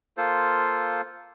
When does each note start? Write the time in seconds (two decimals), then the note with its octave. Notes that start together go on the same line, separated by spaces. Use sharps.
0.17 A#3 F4 A4 C5